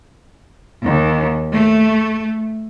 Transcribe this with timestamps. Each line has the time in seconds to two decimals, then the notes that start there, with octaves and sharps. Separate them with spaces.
0.83 D#2
1.53 A3